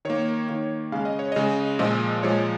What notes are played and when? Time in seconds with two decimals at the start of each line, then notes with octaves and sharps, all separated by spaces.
0.05 D#3 A#3 C#5
0.49 D#3 A#3
0.92 C#3 G#3 F5
1.05 D#5
1.19 C#5
1.32 C#3 G#3 D#5
1.79 A#2 F3 G#3 D#5
2.23 A#2 F3 G#3 C#5